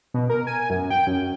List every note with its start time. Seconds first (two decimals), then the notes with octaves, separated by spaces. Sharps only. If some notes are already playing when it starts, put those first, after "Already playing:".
0.14 B2
0.30 A#4
0.47 G#5
0.70 F#2
0.90 G5
1.07 F#2